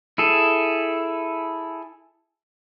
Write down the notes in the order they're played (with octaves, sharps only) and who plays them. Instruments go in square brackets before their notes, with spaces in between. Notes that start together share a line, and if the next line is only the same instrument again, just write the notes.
[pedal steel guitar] E4 G#4 A4